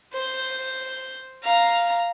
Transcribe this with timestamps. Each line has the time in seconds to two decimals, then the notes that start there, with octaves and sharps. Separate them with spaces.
0.14 C5
1.43 F5 A#5